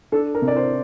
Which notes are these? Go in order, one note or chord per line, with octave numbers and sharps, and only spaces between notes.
D4 A4
A#4
C3
D5
C5